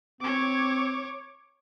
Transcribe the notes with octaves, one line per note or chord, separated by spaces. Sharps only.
C4 C#5 D6